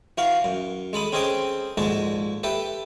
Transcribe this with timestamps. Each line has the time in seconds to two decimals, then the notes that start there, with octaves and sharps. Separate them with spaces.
0.18 E3 F#4 F5 F#5
0.45 F#2
0.93 G#3 A4 B5 D#6
1.12 C4 C#4 G#4 A4 D#5 G5
1.77 A#1 G#2 G#3 F#4 A4 A5
2.43 G4 A4 B4 E5